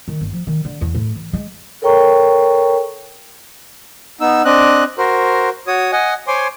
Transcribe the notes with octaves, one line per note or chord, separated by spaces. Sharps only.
D#3
G1
F3
D#3
D3
E2
A2
E3
G#3
A4 A#4 C#5 G5 A#5 C#6
B3 D#4 E6
C4 D4 D#5 F#6
F#4 A#4 C5
F#4 C#5 D#6
D#5 F#5 G#5
C5 C#5 G#5 C6 D6